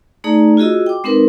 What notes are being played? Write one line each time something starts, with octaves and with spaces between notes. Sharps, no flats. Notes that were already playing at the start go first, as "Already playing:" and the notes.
A3 D#4 G#4 D5 A#5
F4 F#4 G#4 D#5 E6
G5 D6
G#3 C4 D#4 A#4 B4